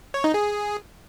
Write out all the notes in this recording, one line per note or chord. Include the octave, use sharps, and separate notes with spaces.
C#5
D#4
G#4